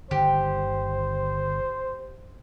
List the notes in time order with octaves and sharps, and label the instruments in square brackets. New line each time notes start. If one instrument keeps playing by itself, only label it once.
[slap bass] G1 D3 D#3 [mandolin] G4 [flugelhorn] C5